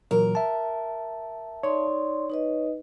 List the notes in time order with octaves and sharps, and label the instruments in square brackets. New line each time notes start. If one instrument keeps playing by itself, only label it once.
[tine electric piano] A#2 E3 F#3 [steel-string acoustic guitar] A#4
[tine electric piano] E5 A5
[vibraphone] D#4 D5 C6 [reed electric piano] C#5
[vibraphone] D#4 B4 D#5